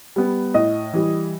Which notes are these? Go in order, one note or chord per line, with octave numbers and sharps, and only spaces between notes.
G3 B3
A2 D#5
E3 G3